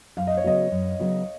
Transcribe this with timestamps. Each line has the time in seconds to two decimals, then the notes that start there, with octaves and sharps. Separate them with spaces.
0.17 F#2 F5
0.27 D#5
0.37 C#5
0.44 C#3 F#3 B3 F#4 D#5
0.72 F#2
0.99 C#3 F#3 B3 F#4